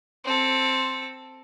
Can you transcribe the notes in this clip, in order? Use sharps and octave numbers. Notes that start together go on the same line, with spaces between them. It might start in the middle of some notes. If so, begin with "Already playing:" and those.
C4 A4